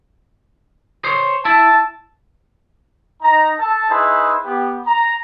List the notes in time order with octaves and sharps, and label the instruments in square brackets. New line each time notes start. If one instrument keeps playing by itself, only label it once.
[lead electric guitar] C5 C#5
[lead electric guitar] E4 [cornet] A5
[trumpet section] D#4 A#5
A4 A5
D#4 E4 G#4 B4 C5
B3 G4
A#5